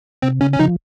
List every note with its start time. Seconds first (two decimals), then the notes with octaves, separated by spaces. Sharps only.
0.22 C3 C4
0.41 C#3 C#4
0.53 C#4
0.59 C#3 F3 D#4